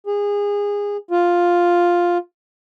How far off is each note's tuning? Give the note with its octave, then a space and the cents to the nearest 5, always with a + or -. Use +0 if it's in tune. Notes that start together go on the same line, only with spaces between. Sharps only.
G#4 -25
F4 +5